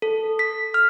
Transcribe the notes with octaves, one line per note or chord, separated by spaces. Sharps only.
A4
B6
F6